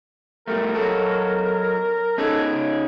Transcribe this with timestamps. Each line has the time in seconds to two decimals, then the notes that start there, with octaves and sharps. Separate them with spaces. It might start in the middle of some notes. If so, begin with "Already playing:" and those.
0.48 A2 G3 A3 A#4
0.74 F#3 F#4 A4
2.18 C#4 D#4 G#4 A4
2.52 C#3